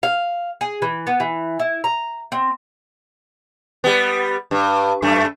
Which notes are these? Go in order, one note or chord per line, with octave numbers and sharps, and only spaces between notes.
F5
G#4
E3
B3
E3
E4
A#5
C4
G3 B3
G2
F#2 A3